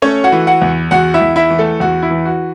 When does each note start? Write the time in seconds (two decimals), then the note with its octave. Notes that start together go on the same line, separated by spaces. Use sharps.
0.02 A3 C#4 C#5
0.24 F#4 F#5
0.32 E3
0.47 F#4 F#5
0.62 E2
0.91 E2 F#4 F#5
1.14 E4 E5
1.21 E2
1.36 E4 E5
1.50 E3
1.58 A3 A4
1.80 E2 F#4
2.02 E4
2.10 E3
2.25 F#4